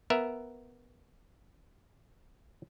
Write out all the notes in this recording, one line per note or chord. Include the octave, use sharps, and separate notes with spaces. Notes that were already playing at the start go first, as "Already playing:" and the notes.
B3 A#4 E5